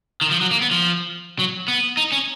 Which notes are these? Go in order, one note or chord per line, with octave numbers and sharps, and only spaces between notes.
D#3
F3
F#3
A#3
B3
F3
F#3
B3
D#4
C#4